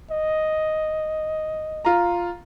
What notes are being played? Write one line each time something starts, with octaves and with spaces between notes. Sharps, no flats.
D#5
F4 A#5